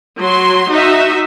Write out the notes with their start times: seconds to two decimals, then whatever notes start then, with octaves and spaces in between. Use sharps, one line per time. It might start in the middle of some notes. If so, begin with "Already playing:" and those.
0.20 F#3 C6
0.71 D#4 F#4 E5